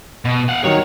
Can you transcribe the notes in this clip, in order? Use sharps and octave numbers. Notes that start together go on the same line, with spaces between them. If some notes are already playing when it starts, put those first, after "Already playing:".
B2
F5 F#5
D#3 F#3 C#5